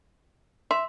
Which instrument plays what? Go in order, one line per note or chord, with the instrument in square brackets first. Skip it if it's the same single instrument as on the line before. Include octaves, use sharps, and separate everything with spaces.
[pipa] E5 [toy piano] C6